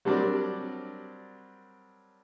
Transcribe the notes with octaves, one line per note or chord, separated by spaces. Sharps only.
F#3 G3 C4 D4 A#4 D5